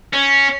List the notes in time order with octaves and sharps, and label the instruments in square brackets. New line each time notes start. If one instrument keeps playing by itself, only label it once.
[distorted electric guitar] C#4